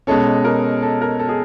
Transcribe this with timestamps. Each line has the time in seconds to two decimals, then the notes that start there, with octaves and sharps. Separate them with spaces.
0.07 B2 G#3 C#4 A4
0.45 A#4
0.82 A4
1.02 A#4
1.19 A4
1.29 G#4